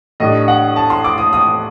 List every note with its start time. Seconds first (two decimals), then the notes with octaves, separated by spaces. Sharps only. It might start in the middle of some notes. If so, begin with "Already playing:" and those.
0.20 A2 G3 D4 D#5
0.48 F#5
0.76 A5
0.90 C6
1.04 D6
1.18 D#6
1.33 D#6